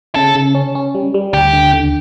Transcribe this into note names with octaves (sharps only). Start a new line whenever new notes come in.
C#3 A4
C#3
C#4
C#4
G3
G3
D2 G4
D3
D3